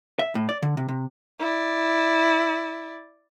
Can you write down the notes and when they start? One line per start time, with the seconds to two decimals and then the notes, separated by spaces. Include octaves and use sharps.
0.19 E5
0.35 A2
0.49 D5
0.62 D3
0.77 C3
0.89 C3
1.39 E4 D5